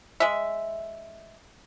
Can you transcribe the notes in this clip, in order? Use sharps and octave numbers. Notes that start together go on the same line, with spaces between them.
G#3 E5